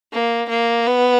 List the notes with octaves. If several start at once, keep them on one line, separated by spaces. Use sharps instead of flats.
A#3
A#3
B3